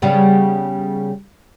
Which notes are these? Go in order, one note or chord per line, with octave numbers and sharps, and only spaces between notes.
C#3 G3 B3